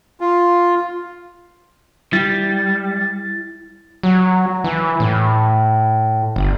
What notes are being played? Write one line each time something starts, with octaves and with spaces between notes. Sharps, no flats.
F4
G3 E4 A6
F#3
E3
A2
G1